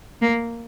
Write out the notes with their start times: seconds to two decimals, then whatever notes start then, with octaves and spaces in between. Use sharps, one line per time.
0.21 A#3